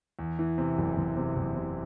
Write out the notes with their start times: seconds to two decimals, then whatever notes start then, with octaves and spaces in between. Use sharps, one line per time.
0.19 E2
0.39 E3
0.58 C3
0.78 F#1
0.97 F#1
1.17 C3
1.36 F#1
1.56 C3